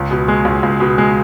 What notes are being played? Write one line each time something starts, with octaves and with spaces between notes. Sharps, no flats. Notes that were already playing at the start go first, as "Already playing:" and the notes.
Already playing: C#2
B2
G#3
C#2
C#2
B2
G#3